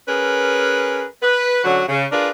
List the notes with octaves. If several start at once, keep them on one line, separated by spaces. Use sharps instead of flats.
C#4 G#4 A#4 B4
B4
D3 F#3 C#4 F#4
C#3
D4 F4 G#4 A#4 B4